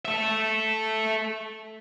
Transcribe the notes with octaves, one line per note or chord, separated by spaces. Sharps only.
A4 E5